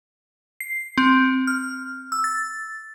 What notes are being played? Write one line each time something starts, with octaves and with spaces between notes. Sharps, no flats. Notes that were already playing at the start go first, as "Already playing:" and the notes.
C7
C4
F6
E6
A6